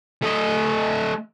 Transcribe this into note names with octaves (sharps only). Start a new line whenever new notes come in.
A3 D#5